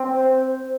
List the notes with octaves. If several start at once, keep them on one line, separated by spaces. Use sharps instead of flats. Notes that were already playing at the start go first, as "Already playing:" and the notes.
Already playing: C4
C5